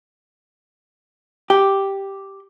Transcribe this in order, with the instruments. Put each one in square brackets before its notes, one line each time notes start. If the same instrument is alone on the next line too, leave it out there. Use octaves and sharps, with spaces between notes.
[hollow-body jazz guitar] G4